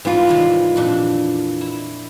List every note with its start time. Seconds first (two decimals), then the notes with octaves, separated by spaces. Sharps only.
0.05 G#2 E3 G3 F4
0.27 C3 D#3 F5
0.76 F2 A#2 D4
1.61 E4